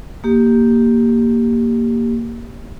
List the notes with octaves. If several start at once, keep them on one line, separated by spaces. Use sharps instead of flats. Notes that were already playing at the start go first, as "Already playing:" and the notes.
A#3 G4